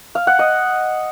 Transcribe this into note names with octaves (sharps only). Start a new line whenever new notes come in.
F5
F#5
D#5